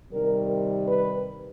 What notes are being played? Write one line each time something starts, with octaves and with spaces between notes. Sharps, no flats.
C3 D#3 G3 A#4
B4